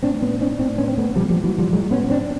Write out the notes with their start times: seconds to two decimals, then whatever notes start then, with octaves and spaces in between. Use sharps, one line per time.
0.03 A2 C4 D4
0.22 B3 C#4
0.41 C4 D4
0.59 A2 C4 D4
0.78 B3 C#4
0.88 C4
0.98 A3 B3
1.16 A#2 F3 G3
1.30 F3 G3
1.44 E3 F#3
1.59 F3 G3
1.73 A2 F#3 G#3
1.91 B3 C#4
2.10 C4 D4